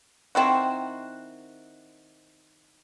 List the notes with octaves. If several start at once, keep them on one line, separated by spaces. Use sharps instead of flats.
D#3 C4 E4 F#4